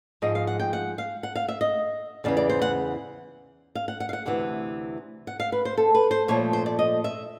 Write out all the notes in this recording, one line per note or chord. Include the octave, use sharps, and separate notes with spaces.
G#2 F3 G#3 D#5
F5
F#5
G5
F#5
F5
F#5
F5
E5
D#5
E2 C#3 E3 D5
D5
C5
F#5
F5
F#5
F#5
F5
F#5
D2 C3 E3 F#5
F#5
F5
B4
C5
A4
B4
C5
A#2 F3 A3 C#5
C5
D5
D#5
E5